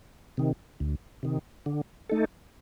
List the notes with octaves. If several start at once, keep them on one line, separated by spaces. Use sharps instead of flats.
C3 D#3
D2
C3 D#3
D3
A3 D#4 A4